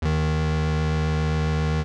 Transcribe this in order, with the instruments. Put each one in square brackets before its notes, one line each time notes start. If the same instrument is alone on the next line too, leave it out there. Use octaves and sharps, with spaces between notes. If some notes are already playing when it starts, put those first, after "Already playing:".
[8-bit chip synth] D#2 D#3